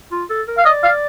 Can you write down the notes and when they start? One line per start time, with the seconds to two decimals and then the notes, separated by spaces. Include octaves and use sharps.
0.11 F4
0.30 A4
0.48 A#4
0.58 F5
0.65 D5 D#5
0.84 F5